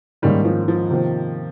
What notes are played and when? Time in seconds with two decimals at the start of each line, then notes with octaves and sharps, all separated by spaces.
0.22 G#2 D#3 G3 A#3 C#4
0.45 F3
0.68 F3
0.90 C3 D#3 A#3 F4 C5